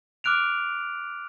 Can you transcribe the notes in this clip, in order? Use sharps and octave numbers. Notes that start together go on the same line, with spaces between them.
D6 F6 F#6 D7 F7